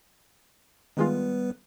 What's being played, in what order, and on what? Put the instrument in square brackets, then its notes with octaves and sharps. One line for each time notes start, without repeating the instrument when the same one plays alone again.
[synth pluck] D#3 G#3 F4 [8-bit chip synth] G3 B3 B4